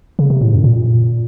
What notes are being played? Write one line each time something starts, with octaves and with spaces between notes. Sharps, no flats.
C#3
C3
A2
F#2
A#2